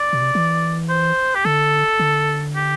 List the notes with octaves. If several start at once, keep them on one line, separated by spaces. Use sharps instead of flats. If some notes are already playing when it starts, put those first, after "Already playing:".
Already playing: D5
B2
C3
E3
C5
G4
D3 A4
D3
G4